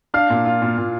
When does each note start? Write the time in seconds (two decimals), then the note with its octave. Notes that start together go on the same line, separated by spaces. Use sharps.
0.14 D4 F5 F6
0.30 A#2
0.46 F4
0.62 A#2
0.78 A#2